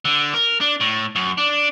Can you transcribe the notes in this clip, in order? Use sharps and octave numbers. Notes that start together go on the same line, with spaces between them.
D3
A#4
D4
A2
F#2
D4